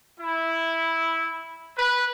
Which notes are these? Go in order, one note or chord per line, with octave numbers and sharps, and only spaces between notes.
E4
B4